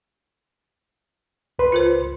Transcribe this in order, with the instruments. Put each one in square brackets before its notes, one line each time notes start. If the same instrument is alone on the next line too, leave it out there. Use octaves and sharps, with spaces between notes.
[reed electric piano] C#2 B4 C6
[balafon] F4 A#4 C5